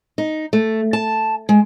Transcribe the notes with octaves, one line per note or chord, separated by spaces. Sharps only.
D#4
A3
A5
G#3